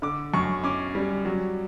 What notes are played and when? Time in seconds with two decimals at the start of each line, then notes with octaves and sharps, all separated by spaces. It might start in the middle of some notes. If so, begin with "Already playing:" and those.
0.02 D3 D6
0.34 F#2 C#6
0.64 C#4 D6
0.95 G3
1.25 F#3